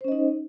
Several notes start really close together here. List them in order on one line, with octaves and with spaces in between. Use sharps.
C5 C#4 D#5 D#4